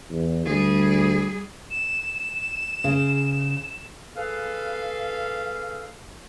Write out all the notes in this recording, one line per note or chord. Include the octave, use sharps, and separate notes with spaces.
E2
D2 G3 G#4
E7
C#3
G#4 A4 B4 F5